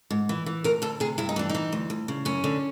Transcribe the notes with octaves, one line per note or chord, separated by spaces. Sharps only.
G#2
E3
E3
D2 A#4
D2 A4
C3 G#4
G2 E4
D#4
E3 D4
D#4
E3
D2
D2
C#3
F#2 C#4
D3